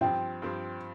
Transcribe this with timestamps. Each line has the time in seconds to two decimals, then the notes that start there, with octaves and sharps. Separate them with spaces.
0.01 G2 F3 C4 G5
0.42 G2 F3 C4